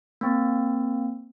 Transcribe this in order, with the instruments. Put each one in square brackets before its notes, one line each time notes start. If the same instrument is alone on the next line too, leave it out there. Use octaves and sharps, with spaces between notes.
[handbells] A#3 C4